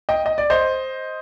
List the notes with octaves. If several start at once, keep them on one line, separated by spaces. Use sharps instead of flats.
D#5 G5
D#5
D5
C5 D#5